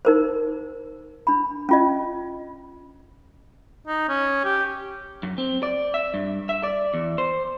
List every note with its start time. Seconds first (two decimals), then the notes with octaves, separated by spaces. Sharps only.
0.05 D#4 A#4 C5
1.27 D4 B5
1.69 C#4 F4 D#5
3.87 D#4
4.09 C#4
4.44 G4
5.23 F#2
5.38 C4
5.63 D5
5.94 E5
6.14 G2
6.49 E5
6.63 D5
6.94 E2
7.18 C5